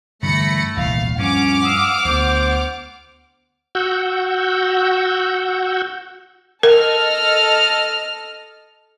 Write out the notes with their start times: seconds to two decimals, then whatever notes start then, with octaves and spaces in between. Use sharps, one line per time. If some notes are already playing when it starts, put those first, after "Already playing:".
0.23 G2 D3 E3 A3 B5 A#6 C#7
0.77 D#1 C2 E3 F5
1.18 G2 F3 C#4 F#5 D6 F6
1.64 F5 D#6 E6
2.05 D2 B3 C5
3.75 F#4 F#5 E6 G6
6.63 A4 A#4 D#5 F6